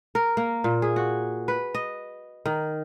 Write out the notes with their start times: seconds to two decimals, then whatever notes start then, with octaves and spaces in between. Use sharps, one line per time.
0.15 A#4
0.37 A#3
0.64 A#2
0.82 G#4
0.96 F#4
1.48 B4
1.75 D#5
2.46 D#3